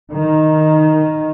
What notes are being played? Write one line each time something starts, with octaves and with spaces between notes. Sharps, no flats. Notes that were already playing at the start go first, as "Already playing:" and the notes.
D#3